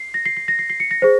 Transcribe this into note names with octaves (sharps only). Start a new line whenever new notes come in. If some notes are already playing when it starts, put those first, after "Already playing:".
Already playing: C7
A#6
C7
C7
A#6
C7
C7
C#7
A#6
G#4 C5